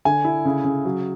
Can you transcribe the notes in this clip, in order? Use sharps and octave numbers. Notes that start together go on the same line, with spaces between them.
D3 G#5
E4
C#3
C#3
F#3